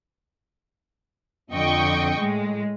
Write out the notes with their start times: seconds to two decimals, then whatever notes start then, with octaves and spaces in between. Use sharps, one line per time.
1.51 F2 D3 D#5 G5 C#6
2.17 A2 G#3